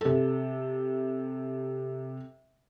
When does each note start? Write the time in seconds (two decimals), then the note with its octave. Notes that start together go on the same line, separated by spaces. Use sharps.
0.01 C3 A4